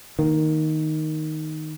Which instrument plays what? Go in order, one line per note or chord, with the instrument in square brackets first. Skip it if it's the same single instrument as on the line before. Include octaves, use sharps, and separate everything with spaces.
[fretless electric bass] D#3 A#3